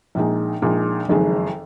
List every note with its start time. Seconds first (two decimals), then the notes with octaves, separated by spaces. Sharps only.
0.15 A#1 A#2 G#3 D#4
0.62 A#1 A#2 G#3 D#4
1.08 F#1 F2 D#3 G#3